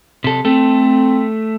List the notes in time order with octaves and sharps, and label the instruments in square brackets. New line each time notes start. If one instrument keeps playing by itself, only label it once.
[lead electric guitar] C3 A4
[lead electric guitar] A3 A4 [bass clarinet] C4